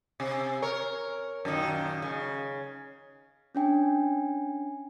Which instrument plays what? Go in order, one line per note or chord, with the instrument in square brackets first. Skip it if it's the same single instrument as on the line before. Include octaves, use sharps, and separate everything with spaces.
[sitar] C3
A#4 C#5
F#2 A#2 D#3
C#3
[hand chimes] C#4 D4 G5 G#5